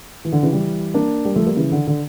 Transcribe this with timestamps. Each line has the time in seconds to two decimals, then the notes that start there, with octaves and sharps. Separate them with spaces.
0.25 E3
0.32 D3
0.43 C#3 E3
0.53 E3 G3
0.94 A#3 D4
1.25 G3 A#3
1.36 F3 A3
1.46 G3 A#3
1.56 C#3 E3
1.72 D3
1.87 D3